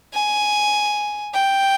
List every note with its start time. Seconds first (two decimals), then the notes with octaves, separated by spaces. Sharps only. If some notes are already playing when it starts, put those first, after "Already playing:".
0.14 G#5
1.34 G5